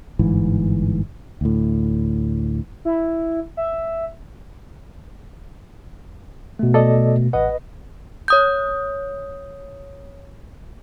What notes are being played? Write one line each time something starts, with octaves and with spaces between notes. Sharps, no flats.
G1 G#2 E3
D2 A2
E4
E5
B2 A3
A4 D5 D#5
A1 B4 D#5 F#5
C#5 D#6 G6